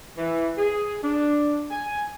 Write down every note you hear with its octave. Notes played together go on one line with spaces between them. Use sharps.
E3
G#4
D4
G#5